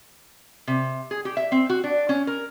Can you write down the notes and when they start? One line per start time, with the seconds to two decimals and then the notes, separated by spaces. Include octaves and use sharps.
0.67 C3
1.11 G#4
1.25 G4
1.37 E5
1.52 C4
1.70 F#4
1.84 D4
2.09 C#4
2.27 A#4